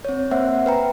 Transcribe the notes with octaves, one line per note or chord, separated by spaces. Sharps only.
C4 C#5
A#3 C4 C5 E5 F#5
B4 G5 A#5